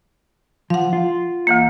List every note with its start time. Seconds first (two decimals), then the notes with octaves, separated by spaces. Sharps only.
0.70 F3 F5 F#5
0.93 F4
1.47 D2 E3 A#3